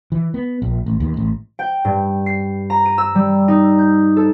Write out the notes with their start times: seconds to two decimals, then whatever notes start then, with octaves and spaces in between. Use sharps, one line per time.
0.12 E3
0.34 B3
0.62 A#1
0.86 A1
1.00 D#2
1.17 A1
1.59 G5
1.85 G2
2.26 C7
2.70 A#5
2.86 D#7
2.98 E6
3.15 G3
3.48 D#4
3.78 G6
4.17 A4